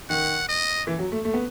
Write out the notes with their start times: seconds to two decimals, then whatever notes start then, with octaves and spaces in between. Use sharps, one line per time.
0.10 D#3 F#5
0.49 D#5
0.87 E3
0.99 F#3
1.12 A3
1.25 A3
1.34 B3